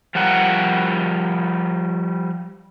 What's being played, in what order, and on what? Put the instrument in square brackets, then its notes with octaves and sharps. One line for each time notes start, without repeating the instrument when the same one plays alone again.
[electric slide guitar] F3 G3 A#4 F#5